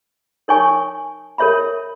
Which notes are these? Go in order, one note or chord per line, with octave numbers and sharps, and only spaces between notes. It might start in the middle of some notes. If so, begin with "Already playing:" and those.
D#4 A#4 C#5 G#5 C#6
A#4 C#5 E5 B5